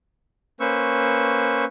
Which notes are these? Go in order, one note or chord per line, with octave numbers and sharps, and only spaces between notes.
A#3 C#4 B4 C5 C#6 E6